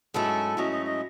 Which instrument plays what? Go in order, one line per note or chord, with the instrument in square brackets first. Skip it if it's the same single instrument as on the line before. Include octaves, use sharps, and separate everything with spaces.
[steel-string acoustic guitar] G#2 F#3 A3 C#4 E4 [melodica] A4
[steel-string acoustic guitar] G#2 F#3 A3 C#4 E4 [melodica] D#5
[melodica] D#5
D#5